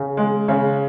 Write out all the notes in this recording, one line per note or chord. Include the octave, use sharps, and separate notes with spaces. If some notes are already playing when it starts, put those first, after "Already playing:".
Already playing: C#3
G#3
C#3